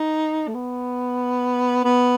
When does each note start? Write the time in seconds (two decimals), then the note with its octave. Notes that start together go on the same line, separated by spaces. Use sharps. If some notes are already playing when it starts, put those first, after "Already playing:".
Already playing: D#4
0.48 A3
0.54 B3
1.84 B3